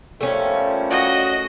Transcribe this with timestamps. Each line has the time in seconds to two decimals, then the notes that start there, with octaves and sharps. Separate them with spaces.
0.21 A#2 F3 G3 A3 C#4
0.91 F#4 D#5